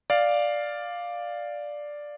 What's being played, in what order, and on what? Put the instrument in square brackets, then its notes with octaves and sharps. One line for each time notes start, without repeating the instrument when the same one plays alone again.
[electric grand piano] D5 F5